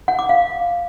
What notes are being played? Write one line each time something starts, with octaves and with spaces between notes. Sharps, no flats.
F#5
D6
F5